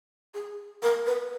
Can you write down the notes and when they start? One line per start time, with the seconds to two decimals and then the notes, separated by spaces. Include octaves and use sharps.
0.34 G#4
0.82 A#4
1.07 B4